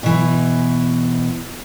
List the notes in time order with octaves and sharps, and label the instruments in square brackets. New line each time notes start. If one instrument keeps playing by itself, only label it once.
[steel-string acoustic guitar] B2 E3